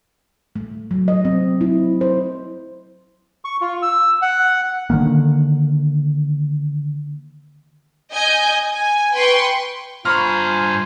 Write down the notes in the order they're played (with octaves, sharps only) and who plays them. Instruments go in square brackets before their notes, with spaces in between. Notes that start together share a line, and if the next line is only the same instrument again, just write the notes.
[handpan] A3
F#3
D#5
C4
E4
C5
[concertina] C#6
F4
E6
F#5
[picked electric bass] D3 D#3 A#3
[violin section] D#5 G#5 G6
G#5
B4 G5 C6 C#6
[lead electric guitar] G2 A#5 [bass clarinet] F4 [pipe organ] C5 G#5 [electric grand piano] B5 C#6 F6